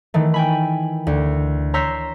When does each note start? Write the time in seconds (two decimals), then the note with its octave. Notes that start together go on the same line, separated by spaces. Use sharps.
0.14 D#3 E3 A3
0.34 G5 G#5 B5
1.07 D2
1.74 C#5 A#5 C6 E6 G6 B6